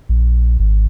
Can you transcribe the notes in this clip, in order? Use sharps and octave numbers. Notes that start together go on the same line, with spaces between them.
A#1
G#1